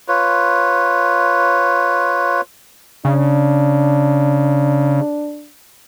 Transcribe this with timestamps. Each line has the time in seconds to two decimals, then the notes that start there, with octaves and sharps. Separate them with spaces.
0.08 F4 B4 C#5
3.05 C#3 D4